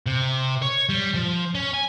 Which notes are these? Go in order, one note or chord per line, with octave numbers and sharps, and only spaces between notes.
C3
C#5
G3
F3
C#4
G#5